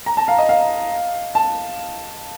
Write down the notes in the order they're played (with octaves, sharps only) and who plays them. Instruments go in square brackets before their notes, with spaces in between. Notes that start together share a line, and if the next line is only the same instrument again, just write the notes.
[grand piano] A#5
A5
F5
D#5
F5
A5